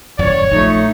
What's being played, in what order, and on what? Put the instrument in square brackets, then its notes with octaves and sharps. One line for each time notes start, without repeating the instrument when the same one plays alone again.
[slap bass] D#1 F#2 A2 [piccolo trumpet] C#5 [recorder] D5
[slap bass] A#1 D#3 F3 [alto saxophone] A3 [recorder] D#4